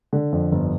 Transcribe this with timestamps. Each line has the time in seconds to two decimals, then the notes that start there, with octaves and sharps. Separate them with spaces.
0.13 D3
0.32 F2
0.52 G1